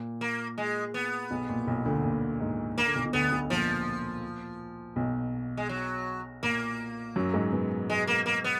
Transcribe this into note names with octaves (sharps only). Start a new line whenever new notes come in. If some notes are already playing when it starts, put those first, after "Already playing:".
Already playing: A#2
A#3
G#3
B3
B1 B2
A#2
B1 B2
D2 D3
A#2
G#2
A#3
D3
B1 B2
B2
D2 D3 B3
B1 B2
A#2 F3
B1 B2
G#3
F#3
A#2 A#3
F#2 F#3
G#2 G#3
B2 B3
G#3
A#3
A#3
B3